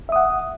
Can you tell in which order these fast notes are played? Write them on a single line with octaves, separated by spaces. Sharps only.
E5 D#6 F#5